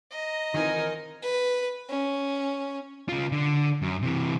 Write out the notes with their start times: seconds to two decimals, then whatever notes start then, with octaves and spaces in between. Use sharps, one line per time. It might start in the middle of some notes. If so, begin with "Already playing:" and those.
0.11 D#5 A#5
0.54 D#3 E3 C4 D#4 F4 A#4 G#5
1.22 B4
1.89 C#4
3.09 C#3 F4
3.32 D3
3.82 F#2
4.02 C3 E3